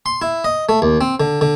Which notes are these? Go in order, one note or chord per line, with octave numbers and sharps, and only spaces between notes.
C6
E4
D#5
A3
D#2
C4
D3
D3